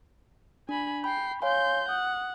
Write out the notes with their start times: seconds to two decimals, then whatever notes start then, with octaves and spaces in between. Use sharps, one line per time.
0.69 D4 G#5 B5
1.04 G5 B5 C7
1.42 C#5 F5 G#5 C6 G6
1.89 F#5 D#6